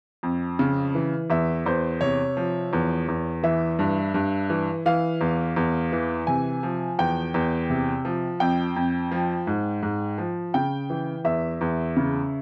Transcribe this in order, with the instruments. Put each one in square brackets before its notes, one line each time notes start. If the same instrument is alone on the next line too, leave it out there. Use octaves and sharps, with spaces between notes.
[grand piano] F2
C#3
E3
E2 E5
E2 C5
C3 C#5
F3
E2
E2
E3 E5
G2
G2
E3
E3 F5
E2
E2
E3
C3 G#5
F3
E2 G5
E2
C3
F3
F2 G5
F2
F3
G#2
G#2
F3
C#3 G5
E3
E2 E5
E2
C#3